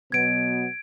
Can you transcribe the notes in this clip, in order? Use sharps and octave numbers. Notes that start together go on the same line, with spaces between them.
B2 F#3 B3 G#6 D7